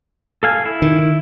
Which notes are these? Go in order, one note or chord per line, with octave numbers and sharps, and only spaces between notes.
A4 F5 G#5
E4
D#3